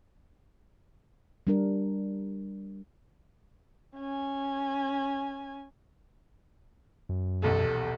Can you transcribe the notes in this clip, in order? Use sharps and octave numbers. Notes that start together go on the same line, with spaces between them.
G3 D4 A#4
C#4 G#5
F#2
D#1 B1 E2 A4